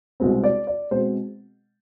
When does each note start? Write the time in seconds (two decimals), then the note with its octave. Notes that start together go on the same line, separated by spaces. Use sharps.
0.20 C2 B2 G#3 C4
0.44 D5
0.67 D5
0.91 B2 G#3 C4 C5